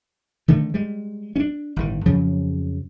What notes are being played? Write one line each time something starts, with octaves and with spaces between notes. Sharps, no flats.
D3 D#3 A3
G3 G#3
C#4 D4
G1 A2 D#3
F2 C#3 F3 F#3